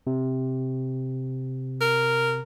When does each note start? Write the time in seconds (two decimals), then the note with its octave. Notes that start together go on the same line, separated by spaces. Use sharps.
0.07 C3
1.81 A#4